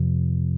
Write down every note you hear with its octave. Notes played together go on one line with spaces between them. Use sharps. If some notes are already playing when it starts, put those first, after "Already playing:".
Already playing: F2 C3 F3